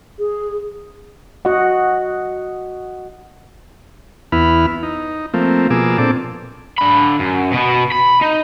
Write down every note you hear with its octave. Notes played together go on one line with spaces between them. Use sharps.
G#4
F#4 D#5 F#5
E2 B3 E4 B5 F6
D#4
F3 A3 A#3 C4
B2 F3 A#3 G#4 D6 E6
A#2 C4 D4 A4 D6
D3 B5
F#2
B2 B3
B5
D#4